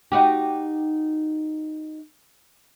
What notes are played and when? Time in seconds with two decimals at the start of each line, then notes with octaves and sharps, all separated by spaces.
0.12 D#4 F#4 G4